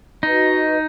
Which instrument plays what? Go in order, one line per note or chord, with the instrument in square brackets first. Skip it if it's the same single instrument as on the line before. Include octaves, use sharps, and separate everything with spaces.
[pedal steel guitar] D#4 [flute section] F#4 B4 D#5